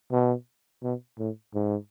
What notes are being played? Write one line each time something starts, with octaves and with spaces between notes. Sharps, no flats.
B2
B2
A2
G#2